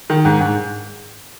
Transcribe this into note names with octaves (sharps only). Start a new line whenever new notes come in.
D#3
G#2
G#2